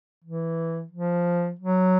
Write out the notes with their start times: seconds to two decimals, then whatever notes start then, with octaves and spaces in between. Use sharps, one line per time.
0.24 E3
0.91 F3
1.59 F#3